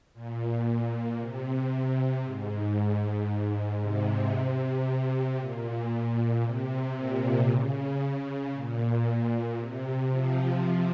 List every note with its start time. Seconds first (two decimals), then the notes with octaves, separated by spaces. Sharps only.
0.14 A#2
1.19 C3
2.24 G#2
3.28 G#2
3.81 C3
5.38 A#2
6.42 C3
6.96 A#2
7.47 C#3
8.53 A#2
9.06 A#2
9.57 C3
10.09 F3